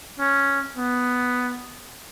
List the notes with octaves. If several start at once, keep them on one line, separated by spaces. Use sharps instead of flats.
C#4
B3